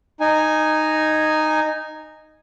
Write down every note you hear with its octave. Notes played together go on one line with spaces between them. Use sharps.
D#4 G#5